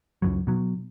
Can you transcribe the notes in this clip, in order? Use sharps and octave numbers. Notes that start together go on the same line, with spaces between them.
C#2 F#2 F#3
B2 F#3